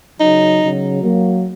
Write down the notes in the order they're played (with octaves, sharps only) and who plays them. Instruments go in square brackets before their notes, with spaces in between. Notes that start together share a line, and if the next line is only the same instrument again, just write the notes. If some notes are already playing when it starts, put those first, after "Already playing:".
[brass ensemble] C#3 F#3 [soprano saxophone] D#4
[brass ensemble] C#3 F#3
F#3 A#3